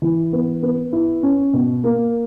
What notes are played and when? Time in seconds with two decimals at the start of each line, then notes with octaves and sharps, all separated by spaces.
0.02 E3
0.33 B3
0.63 B3
0.93 E4
1.23 C#4
1.53 B2
1.84 A#3